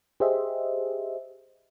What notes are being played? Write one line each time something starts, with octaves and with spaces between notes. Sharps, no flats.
G4 G#4 C5 D#5 E5